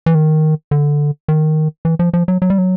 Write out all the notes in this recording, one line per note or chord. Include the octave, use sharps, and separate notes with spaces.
E3
D#3
D3
D#3
E3
F3
F3
F#3
F#3
G3
F#3